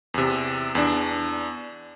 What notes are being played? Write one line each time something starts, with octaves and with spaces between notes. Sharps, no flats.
E2 C3
E2 D4